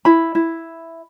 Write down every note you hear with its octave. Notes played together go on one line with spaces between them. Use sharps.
E4 B5
E4